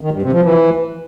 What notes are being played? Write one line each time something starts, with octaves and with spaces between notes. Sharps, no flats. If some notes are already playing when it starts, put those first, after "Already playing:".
D#3
G2
C3
F3
E3